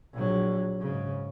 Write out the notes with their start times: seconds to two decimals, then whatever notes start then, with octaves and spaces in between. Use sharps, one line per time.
0.14 A#1 F#3
0.81 G#2 C#3